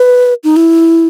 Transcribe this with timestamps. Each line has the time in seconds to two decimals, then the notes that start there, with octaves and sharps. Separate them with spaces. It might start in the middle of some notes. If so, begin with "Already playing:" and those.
Already playing: B4
0.44 D#4
0.56 E4